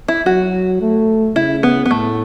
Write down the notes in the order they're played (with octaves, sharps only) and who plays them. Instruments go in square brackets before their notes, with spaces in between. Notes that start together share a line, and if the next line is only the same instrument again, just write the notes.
[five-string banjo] E4
[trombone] F#3 [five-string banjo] F#4
[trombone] A3
[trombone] C#3 [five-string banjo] E4
[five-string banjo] B3
B3
[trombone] A2 [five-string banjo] A3